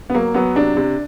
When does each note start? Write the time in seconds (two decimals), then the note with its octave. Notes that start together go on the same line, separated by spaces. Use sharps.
0.10 B3
0.14 F#3 A#3
0.34 F#3 B3
0.55 C3 D4
0.77 C3